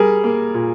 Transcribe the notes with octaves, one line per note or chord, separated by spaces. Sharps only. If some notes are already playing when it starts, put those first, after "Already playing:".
Already playing: G3 G#4 A#4
A#3
A#2